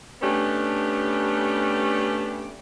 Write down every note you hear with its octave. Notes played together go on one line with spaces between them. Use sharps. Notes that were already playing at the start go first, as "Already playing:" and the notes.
A3 B3 C#4 D4 G4